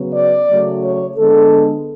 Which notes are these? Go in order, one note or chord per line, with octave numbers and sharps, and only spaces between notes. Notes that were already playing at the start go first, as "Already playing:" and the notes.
Already playing: C#3 F#3 B3
D5
C#3 F#3 A3
C#5
D3 G#3 B3 A4